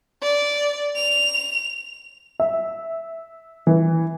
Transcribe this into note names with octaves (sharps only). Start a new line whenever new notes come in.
D5
F7
E5
E3